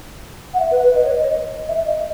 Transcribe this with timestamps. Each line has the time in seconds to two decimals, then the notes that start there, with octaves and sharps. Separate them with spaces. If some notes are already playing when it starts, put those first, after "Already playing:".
0.54 F#5
0.59 E5
0.71 B4
0.84 B4
0.95 D#5
1.05 C#5
1.13 D#5
1.68 E5
1.86 D#5